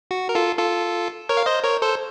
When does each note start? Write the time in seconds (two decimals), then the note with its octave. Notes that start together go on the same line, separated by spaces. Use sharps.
0.11 F#4
0.29 A#4
0.35 F4 A4
0.58 F4 A4
1.29 A#4 C#5
1.37 F5
1.46 C5 D#5
1.64 A#4 C#5
1.82 A4 C5